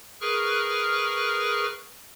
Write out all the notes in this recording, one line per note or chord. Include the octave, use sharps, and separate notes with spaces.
G#4 A#4 B4 C#6 F6 F#6